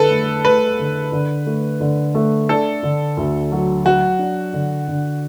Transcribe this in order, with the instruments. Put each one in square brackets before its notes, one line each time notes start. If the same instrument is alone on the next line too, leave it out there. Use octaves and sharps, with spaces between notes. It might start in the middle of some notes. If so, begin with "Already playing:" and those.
Already playing: [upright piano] D3 [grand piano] A4 B4
[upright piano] A3
[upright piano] A3 [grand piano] B4
[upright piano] D3
D3
A3
D3
A3
[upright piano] D4 [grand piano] A4
[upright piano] D3
D2
F#3
[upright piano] F#3 [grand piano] F#4
[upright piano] D4
D3
D3